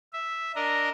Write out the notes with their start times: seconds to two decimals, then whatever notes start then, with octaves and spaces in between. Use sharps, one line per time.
0.13 E5
0.56 D4 A#4 D#5